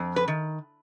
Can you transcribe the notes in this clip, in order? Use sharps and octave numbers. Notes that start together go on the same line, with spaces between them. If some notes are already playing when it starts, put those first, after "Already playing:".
Already playing: F2
B4
D#3